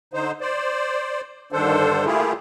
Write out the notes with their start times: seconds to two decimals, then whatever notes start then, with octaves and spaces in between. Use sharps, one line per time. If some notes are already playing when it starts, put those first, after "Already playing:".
0.13 D3 D#4 C5
0.41 C5 D5
1.52 G2 D3 D#3 D4 A4 C5
2.05 A3 A#3 E4 F4 G4 G#4